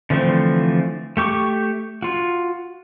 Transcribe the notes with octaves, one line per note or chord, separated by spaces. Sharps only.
D3 E3 F3 A3 C4
A3 G4 C#6 D6
F4 F#4